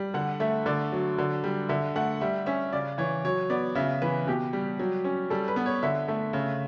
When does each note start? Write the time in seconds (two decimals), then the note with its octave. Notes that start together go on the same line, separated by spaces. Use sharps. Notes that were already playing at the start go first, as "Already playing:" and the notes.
Already playing: G3
0.14 D3 F#5
0.40 A3 E5
0.66 D3 D5
0.92 F#3
1.18 D3
1.44 G3
1.69 D3 E5
1.96 A3 F#5
2.21 G3 E5
2.46 C#4 E5
2.73 C#3 D5
2.98 E3 C#5
3.25 F#3 C#5
3.50 B3 D5
3.75 C#3 E5
4.02 E3 B4
4.27 B2 G4
4.53 G3
4.79 F#3
5.04 C#4
5.30 G3 A4
5.48 B4
5.56 B3
5.66 C#5
5.83 D3 E5
6.08 A3
6.33 C#3